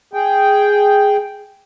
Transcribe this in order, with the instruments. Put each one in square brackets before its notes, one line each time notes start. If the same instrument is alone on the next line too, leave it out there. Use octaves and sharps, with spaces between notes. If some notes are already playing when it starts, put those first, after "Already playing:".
[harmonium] G#4 G5